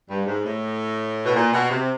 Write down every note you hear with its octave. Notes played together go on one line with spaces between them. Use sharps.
G2
G#2
A2
B2
A#2
B2
C3